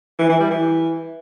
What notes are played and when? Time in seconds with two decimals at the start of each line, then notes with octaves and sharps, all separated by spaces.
0.19 E3
0.29 E3
0.40 G3
0.50 E3